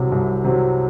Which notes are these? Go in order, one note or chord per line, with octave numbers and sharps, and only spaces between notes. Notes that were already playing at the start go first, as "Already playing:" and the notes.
Already playing: C2 C3 F#3
C2
C3 F#3